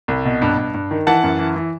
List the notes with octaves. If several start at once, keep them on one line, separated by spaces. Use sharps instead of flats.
C2
B2
G2
G2
G2
D#3
E3 F#5 A5
F#2
E3
E3